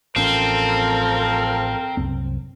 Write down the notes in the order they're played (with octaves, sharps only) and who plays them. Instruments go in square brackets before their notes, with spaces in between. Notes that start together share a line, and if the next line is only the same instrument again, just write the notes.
[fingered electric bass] A1 C#4 [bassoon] F3 [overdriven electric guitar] C4 [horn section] A4 A#4
[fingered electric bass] C2 F#2 C4